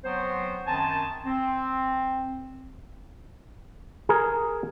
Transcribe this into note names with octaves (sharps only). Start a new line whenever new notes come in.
F#3 B3 C4 C5
F#2 D#3 C4 G#5 A5
C4
G#4 A#4